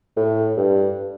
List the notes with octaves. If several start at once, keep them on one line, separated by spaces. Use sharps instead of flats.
A2
G2